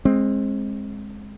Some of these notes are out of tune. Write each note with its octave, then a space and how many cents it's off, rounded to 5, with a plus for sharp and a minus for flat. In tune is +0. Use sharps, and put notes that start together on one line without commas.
G#3 +0 C4 +25